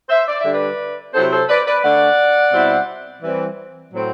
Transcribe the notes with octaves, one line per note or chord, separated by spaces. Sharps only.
C5 E5
D5
E5
D3 G3 D4
B4 D5
C3 F#3 C4 E4 A4 C5
A4 C5
B4 D5
B4 D5
D3 A3 D4 D5 F#5
B2 G3 C4 E4
E3 G3 C4
A2 F#3 C4